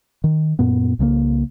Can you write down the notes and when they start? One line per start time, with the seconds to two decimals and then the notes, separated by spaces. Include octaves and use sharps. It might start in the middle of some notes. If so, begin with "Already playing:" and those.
0.24 D#3
0.59 F#2 A#2 B3
0.99 C2 C#3 G#3 A#3